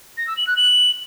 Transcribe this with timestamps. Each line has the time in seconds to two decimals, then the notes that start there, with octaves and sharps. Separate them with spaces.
0.18 A#6
0.27 E6
0.37 F#7
0.47 F#6
0.57 F#7